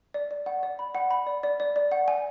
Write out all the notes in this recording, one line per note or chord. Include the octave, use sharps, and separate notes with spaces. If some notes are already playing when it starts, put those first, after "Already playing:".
D5
D5
F#5
D5
B5
F#5
B5
D5
D5
D5
D5
F#5
G#5